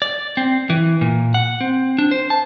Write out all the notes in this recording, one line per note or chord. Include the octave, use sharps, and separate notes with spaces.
D5
C4
E3
A#2
F#5
C4
D4
C5
A5